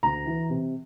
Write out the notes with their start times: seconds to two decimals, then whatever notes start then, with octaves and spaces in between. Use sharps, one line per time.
0.03 D2 A#5
0.26 E3
0.50 C3